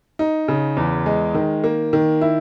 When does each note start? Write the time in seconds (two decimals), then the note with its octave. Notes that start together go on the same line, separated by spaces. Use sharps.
0.19 D#4
0.48 C#3
0.77 E2
1.06 G#3
1.35 D#3
1.64 A#3
1.93 D#3
2.21 E4